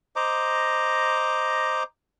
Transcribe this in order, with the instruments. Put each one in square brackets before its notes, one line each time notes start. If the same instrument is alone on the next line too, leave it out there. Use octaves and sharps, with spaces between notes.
[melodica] C5 D#5 A#5 D6